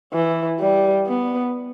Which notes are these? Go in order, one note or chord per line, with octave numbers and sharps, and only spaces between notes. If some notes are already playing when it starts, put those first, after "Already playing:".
E3
G3
B3